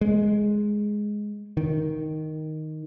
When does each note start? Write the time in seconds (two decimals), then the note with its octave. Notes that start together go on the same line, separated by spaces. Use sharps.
0.01 G#3
1.57 D#3